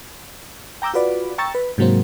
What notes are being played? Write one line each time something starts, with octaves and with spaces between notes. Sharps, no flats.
G5 A#5 D6 E6 G6
F4 F#4 B4 D5
G5 A#5 C#6 E6 A6
B4
G#2 C3 F#3 A#3 C4